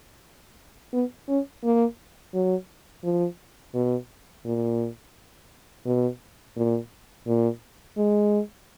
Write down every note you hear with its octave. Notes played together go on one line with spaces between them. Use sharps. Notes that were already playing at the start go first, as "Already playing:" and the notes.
B3
C#4
A#3
F#3
F3
B2
A#2
B2
A#2
A#2
G#3